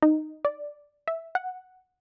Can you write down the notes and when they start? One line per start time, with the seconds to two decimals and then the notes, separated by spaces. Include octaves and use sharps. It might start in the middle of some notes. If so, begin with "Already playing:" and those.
0.02 D#4
0.45 D5
1.08 E5
1.35 F#5